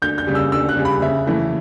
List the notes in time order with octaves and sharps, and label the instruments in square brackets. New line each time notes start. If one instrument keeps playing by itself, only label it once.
[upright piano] D2 G6
G6
C#3 G3
E6
D2 E6
F#6
C#3 G3
B5
C#3 E5
E3 A3 E4